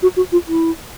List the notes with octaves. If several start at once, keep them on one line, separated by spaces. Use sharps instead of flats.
F#4
F#4
F4
E4